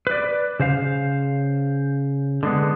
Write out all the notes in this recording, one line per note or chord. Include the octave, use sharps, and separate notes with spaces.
B4 D5
C#3 C5 F5
D3 G#3 B3